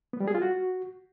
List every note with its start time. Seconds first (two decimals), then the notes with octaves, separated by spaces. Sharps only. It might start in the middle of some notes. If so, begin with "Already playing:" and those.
0.13 B3
0.20 G3
0.28 G#4
0.35 F4
0.42 F#4